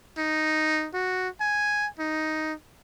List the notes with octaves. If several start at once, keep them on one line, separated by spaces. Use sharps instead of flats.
D#4
F#4
G#5
D#4